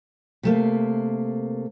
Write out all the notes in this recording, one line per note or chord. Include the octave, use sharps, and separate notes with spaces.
C3 A3 A#3